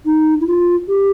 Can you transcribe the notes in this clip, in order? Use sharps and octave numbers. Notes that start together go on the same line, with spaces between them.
D#4
E4
F4
G4